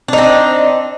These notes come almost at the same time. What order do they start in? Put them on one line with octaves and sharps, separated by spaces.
D4 D#4 C4